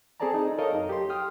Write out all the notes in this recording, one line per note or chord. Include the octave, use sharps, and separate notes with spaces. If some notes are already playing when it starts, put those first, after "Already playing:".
C4 G#4 A4 D5 A5 A#5
D#4
D#4 A4 A#4 C#5 D#5 F5
F#2
G4 C6
G5 D#6 F6